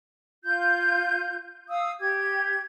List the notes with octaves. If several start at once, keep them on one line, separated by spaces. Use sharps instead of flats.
F4 G6
F5 D#6 E6
G4 G#6